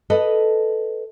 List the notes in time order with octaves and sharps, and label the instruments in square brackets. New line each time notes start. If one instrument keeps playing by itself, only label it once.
[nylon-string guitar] A4 B4 D#5